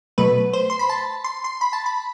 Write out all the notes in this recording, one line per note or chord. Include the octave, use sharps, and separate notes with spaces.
B2 F#3 A3 B4
C5
C6
B5
A5
C6
C6
B5
A5
B5